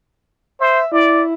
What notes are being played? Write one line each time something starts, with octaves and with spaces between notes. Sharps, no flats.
C5 E5
E4 D5